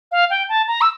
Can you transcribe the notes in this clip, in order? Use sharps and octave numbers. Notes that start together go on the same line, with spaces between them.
F5
G5
A5
A#5
E6